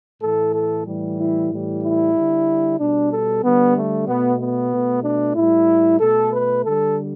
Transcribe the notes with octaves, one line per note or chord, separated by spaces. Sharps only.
A2 E3 A3 A4
A4
A2 E3 G3
E4
A2 E3 G3
E4
D3 G3
B2 G3 D4
A4
D3 G3 B3
A3
B2 A3 B3
B3
B2 A3
D4
A2 G3 E4
B2 A3 A4
B4
D3 G3 A4